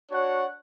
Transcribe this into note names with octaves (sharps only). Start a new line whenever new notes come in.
D4 F#4 C#5 F#5